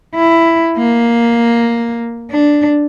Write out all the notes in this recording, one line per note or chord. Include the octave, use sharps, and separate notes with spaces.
E4
A#3
D4